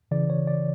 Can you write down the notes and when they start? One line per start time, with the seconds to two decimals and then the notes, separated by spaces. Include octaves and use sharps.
0.11 C#3 E3 D5
0.30 C#5
0.47 D5